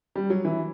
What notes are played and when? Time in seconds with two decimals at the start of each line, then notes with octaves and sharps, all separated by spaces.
0.16 G3
0.30 F#3
0.45 E3